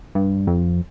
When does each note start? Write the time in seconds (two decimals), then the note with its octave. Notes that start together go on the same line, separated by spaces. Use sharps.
0.15 G2
0.47 F2